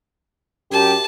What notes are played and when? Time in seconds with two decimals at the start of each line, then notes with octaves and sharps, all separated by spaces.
0.72 F#2 G4 A5